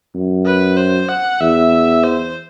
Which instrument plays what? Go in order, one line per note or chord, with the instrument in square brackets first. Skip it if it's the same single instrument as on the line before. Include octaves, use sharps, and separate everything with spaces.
[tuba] F#2
[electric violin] B4
C5
F#5
[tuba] E2 [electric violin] E5
[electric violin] C5